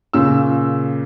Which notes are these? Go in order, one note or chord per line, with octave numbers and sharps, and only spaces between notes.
A#2 C#3 E6